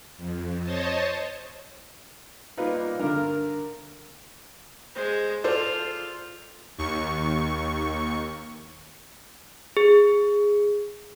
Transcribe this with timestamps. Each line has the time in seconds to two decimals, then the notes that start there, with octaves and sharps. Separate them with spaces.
0.17 F2
0.63 C5 C#5 D#5 A5
2.57 G3 A#3 B3 D#4 F4 B4
2.99 G2 D3 A#4
4.95 G#3 C5
5.44 F4 A4 C5 D5
6.78 D#2 C#6
9.77 G#4